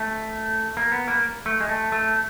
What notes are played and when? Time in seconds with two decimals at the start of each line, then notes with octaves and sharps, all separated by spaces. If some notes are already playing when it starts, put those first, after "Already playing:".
Already playing: A3
0.77 A#3
0.92 B3
1.08 A#3
1.46 A3
1.60 G#3
1.69 A3
1.92 A3